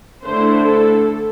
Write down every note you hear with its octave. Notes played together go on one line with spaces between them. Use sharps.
D3 A3 E4 C5
A4